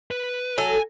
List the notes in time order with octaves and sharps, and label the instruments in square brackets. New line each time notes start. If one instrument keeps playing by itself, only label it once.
[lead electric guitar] B4
[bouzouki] F#3 A4 [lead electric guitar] G#5